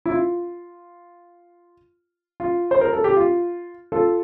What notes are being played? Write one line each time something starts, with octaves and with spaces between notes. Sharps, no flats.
E4
F4
F4
C5
A#4
A4
G4
F4
F4 A4